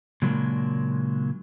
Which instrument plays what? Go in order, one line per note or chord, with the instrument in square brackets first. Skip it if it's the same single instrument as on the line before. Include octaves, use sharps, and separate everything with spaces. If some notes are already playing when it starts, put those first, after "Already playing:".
[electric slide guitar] A#2 C#3 F#3 G#3 A#3 D4